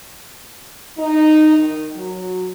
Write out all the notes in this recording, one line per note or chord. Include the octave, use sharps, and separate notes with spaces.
D#4
D#3
F#3